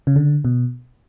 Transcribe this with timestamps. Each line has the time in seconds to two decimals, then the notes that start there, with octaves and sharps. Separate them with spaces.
0.07 C#3
0.16 D3
0.45 B2